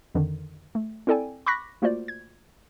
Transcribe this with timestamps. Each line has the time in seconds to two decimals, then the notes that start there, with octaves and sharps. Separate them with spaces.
0.15 F2 D3 D#3
0.75 A3
1.07 C4 E4 A4 D5 G5 G#5
1.46 B5 C#6 D6 F#6 A#6 B6
1.82 A3 A#3 F4 F#4 C5 D5
2.08 G#6